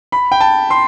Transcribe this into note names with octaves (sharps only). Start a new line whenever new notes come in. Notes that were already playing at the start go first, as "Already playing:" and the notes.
B5
G5
A5
C6